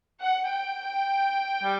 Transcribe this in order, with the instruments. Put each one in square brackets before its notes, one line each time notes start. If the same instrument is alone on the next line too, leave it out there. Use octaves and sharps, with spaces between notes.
[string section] F#5
G5
[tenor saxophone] G3